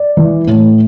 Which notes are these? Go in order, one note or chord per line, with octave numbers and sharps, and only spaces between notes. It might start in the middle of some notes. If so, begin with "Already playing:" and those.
Already playing: D5
E3
A2